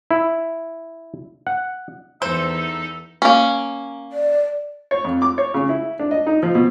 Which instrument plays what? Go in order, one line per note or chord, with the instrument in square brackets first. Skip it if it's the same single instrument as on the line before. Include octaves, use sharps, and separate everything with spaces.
[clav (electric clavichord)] E4
F#5
[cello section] E2 [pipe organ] D#4 A4 [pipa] C5 [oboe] E5
[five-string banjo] A#3 C#4
[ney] D5
[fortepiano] C#5
F2
D6
C#5
C#3
E4
D4
D#5
D#4
F3
B2